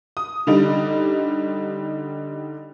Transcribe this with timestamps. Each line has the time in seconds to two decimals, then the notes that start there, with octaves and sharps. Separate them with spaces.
0.17 D#6
0.47 D3 G3 D#4